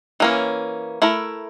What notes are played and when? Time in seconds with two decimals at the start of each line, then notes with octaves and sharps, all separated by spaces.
0.20 E3 A#3 C#4
1.02 A3 E4 A#4